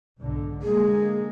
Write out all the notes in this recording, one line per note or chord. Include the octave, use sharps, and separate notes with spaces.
B1 G#2 D3
D3 G#3 A#3 G#4